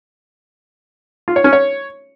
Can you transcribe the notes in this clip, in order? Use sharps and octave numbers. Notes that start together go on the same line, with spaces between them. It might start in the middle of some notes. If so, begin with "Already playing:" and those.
F4
C#5
C#4
C#5